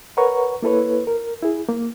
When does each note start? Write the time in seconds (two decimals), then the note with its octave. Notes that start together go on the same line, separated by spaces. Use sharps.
0.17 A#4 B4 C#5 F#5 A#5 C#6
0.62 A#3 E4 A4 B4 C#5
1.07 A#4
1.43 E4 G#4
1.69 A#3